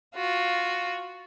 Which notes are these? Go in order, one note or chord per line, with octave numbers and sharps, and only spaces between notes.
F4 F#4